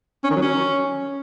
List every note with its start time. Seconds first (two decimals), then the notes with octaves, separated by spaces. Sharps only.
0.24 C#4
0.30 D#3
0.37 F#3
0.43 C#4